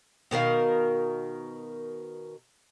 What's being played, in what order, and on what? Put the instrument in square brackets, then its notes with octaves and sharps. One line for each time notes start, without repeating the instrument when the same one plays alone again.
[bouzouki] B2 D#3 A#4 F5